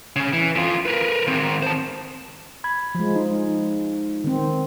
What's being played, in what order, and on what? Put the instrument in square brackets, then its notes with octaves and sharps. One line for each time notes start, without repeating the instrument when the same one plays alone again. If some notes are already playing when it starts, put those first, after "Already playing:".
[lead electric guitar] C#3 C#4
E3
F2 F4
A#4 B4
D#3 C4
C5 A5
[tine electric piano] B5 G#6
[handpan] F3 G#3
[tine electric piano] D#4
[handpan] D#3 C4